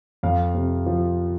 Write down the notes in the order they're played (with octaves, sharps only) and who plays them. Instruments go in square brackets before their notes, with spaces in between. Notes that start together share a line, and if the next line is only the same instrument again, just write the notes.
[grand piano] F2 F5
C3
F3